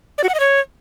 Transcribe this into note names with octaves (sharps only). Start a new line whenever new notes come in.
D5
F#4
F#5
D#5
C#5